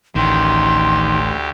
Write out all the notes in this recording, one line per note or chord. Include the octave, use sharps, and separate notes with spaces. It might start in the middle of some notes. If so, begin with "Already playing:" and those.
A1 D2 D#3 G4 C6